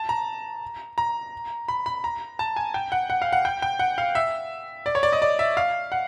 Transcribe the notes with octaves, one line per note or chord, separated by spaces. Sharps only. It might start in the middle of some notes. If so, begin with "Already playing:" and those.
Already playing: A5
A#5
A#5
B5
B5
A#5
A5
G#5
G5
F#5
F#5
F5
F#5
G5
G5
F#5
F5
E5
D5
C#5
D5
D#5
D5
E5
F5
F#5